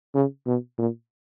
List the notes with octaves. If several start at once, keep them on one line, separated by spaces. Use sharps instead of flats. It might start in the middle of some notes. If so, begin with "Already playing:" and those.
C#3
B2
A#2